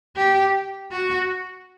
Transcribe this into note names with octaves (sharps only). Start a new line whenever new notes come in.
G4
F#4